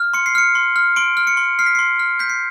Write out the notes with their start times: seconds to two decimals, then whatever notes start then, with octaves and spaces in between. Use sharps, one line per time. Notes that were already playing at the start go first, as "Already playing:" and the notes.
Already playing: F6
0.13 C6 C#7
0.26 C7
0.35 F6 C#7
0.55 C6
0.76 F6
0.96 C6 D7
1.17 F6
1.27 C#7
1.37 C6
1.59 F6 C7
1.66 B6
1.75 C6 C7
2.00 F6
2.19 G6 B6
2.29 C7